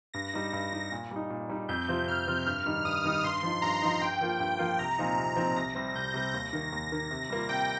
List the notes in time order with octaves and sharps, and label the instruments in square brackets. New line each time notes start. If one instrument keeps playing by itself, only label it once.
[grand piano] G2 [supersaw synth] A#6
[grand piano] G3 D#4
G2
G3 D#4
A#2
G3 D#4
A#2
G3 D#4
[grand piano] F2 [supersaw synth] G6
[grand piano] C3 F3 C4 F4
[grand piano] F2 [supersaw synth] F6
[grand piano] C3 F3 C4 F4
[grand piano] G2 [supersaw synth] F6
[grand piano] D#3 G3 D#4
[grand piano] G2 [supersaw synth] D#6
[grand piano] D#3 G3 D#4
[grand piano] G2 [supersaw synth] C6
[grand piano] F3 D#4
[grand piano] G2 [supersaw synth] A#5
[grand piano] F3 D#4
[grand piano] G2 [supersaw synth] G5
[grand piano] F3 A#3 F4
[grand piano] G2 [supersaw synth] G5
[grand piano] F3 A#3 F4
[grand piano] C2 [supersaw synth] A#5
[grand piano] A#2 F3 C4 D#4
C2
A#2 F3 C4 D#4
[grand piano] C2 [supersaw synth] A#6
[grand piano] C3 G3 C4
[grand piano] C2 [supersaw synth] G6
[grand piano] C3 G3 C4
[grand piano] D#2 [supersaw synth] A#6
[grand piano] D#3 A#3
[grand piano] D#2 [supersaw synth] A#6
[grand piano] D#3 A#3
C3
G3 A#3 F4
[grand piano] C3 [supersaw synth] G5